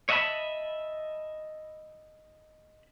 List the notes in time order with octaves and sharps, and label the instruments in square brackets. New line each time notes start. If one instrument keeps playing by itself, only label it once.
[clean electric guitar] C#5 D#5 E5 F#5 A5 B5